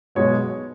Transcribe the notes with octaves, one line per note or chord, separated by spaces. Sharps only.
B1 B2 G#3 B3 C#5